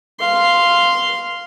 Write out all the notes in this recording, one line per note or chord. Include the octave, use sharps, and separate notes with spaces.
F5 C6